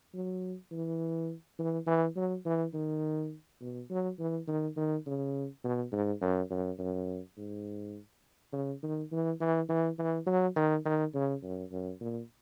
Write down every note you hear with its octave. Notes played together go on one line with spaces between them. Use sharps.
F#3
E3
E3
E3
F#3
E3
D#3
B2
F#3
E3
D#3
D#3
C#3
B2
G#2
F#2
F#2
F#2
G#2
C#3
D#3
E3
E3
E3
E3
F#3
D#3
D#3
C#3
F#2
F#2
A#2